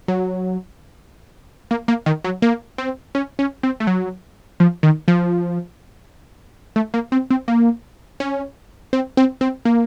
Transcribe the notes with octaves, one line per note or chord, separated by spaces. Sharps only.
F#3
A#3
A#3
D#3
F#3
A#3
C4
C#4
C#4
C4
A3
F#3
F3
D#3
F3
A3
A#3
C4
C4
A#3
C#4
C4
C4
C4
A#3